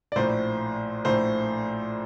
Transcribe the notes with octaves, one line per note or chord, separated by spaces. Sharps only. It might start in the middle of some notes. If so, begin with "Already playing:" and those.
D5
A#1 A2 C5
A#1 A2 C5